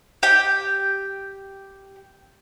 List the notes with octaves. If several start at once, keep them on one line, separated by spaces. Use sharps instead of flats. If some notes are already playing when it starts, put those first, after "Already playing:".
G4 G5